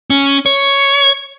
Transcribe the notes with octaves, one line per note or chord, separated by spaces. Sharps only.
C#4
C#5